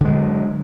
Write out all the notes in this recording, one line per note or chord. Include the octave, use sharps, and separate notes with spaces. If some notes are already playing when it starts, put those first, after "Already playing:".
D3 F#3 G#3